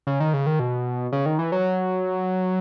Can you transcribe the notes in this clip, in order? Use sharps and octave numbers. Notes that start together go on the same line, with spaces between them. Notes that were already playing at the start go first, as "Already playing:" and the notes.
C#3
D#3
C#3
D#3
B2
C#3
D#3
E3
F#3